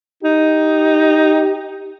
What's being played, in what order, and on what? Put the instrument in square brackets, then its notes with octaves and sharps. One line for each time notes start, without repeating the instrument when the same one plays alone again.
[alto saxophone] D#4 [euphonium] G4